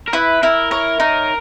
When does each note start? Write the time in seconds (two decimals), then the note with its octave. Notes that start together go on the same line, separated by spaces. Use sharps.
0.08 A#4
0.13 E4 B4
0.43 E4 A#4
0.71 A#4 C#5
1.00 D#4 A#4